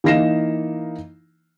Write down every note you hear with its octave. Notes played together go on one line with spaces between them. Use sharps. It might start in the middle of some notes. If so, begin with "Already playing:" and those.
E3 A#3 D#4 A#6 C7 E7